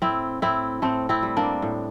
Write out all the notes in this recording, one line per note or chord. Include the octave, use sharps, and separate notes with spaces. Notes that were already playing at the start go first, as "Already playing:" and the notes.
A2 C4 E4
A2 C4 E4
A2 A3 C4
C4 E4
G3
A#3 D4
A2